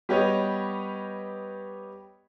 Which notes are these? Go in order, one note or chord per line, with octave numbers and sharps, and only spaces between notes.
G3 B3 G4 B4 C#5 D#5